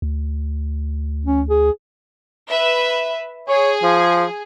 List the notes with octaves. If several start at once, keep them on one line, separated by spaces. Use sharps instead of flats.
D2
C#4
G#4
B4 E5
G#4 C#5
F3